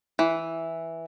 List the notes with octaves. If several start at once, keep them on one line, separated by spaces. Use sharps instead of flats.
E3